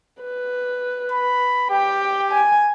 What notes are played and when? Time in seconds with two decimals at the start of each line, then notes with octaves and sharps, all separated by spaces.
0.22 B4
1.12 B5
1.70 G4 G5
2.31 G#5